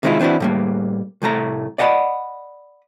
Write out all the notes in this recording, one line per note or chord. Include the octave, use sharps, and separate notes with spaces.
C3 D#3 G#3 D4 E4 F4
E3 C4 D4 E4 F#4
A2 G3 A#3
C2 A2 A3 A#5
D5 D#5 F#5 G5 B5